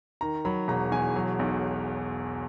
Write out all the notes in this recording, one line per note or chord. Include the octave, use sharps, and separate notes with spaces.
D#3 A#5
F#3 B5
E1 A#5
E2 G#5
F#3
B1